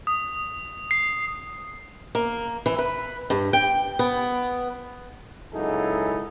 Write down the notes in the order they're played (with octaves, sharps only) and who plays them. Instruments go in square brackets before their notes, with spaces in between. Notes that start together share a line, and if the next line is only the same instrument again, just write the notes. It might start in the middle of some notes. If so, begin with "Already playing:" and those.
[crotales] D#6
C7
[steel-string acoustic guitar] A#3
E3
B4
G2
G5
B3
[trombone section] C#2 F#3 D#4 E4 G#4 A4